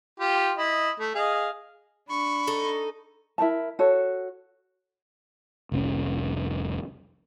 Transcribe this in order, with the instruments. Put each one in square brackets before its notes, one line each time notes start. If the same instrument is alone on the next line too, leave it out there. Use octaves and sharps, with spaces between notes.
[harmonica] F4 G4 G5
E4 D#5
A3
G#4 D#5 F5
[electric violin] D4 C#6 [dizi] B5
[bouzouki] D#4 A4
[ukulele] E4 A#4 C5 A5
F#4 A4 C#5
[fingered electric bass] F1 C2 C4 C#4